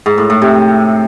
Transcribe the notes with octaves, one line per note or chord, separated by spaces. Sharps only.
G#2
A2
A2
C3